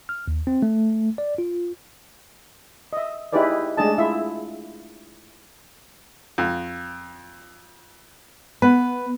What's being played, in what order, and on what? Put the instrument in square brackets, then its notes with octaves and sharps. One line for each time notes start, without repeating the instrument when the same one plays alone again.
[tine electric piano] F6
D#2
C4
A3
D5
F4
[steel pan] D#5 E5
D#4 E4 G4 G#4 B4 D5
G#3 A3 D4 G#4 D#5 A5
E4 F4 E5
[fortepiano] F2
[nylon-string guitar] B3 [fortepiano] B4